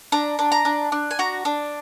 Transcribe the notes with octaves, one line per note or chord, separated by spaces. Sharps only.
D4 A#5
D4
A#5
D4
D4
G#5
F#4 A#5
D4